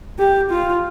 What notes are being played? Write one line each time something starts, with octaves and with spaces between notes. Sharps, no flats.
G4
F4